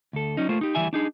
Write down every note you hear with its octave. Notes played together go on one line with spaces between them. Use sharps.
D2 A4
F#3 C#4 D#4
A3 A#3 F4 C5
D#4 G4
D2 C#3 E3 G3 E5 G#5
D4 D#4 G#4